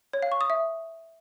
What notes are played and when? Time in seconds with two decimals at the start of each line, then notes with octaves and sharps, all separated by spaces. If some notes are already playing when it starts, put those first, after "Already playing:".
0.13 C#5
0.22 F5
0.32 C#6
0.41 D#6
0.50 E5